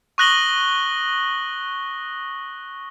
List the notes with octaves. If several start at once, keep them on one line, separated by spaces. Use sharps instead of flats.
C#6 D#6 F#6 A#6 F#7 G7